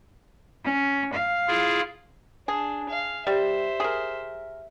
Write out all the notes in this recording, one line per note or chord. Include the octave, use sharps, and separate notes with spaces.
C#4
F5
E4 F4 G#4
D4 G#4
F5
G3 G4 C5 E5
G#4 A#4